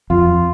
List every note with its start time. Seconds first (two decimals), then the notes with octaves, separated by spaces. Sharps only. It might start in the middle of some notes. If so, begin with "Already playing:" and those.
0.10 F2 F4